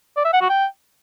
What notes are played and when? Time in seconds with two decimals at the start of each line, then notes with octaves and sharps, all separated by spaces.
0.17 D5
0.25 E5
0.33 F#5
0.41 F#4
0.50 G5